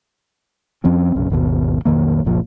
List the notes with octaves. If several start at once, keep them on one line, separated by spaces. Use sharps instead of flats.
F2 F3 C4 C#4
B1 F#2 C#3
G#1 D#2 B2
B1 F2 D#3 A#3
F#1 C2 A#2 F3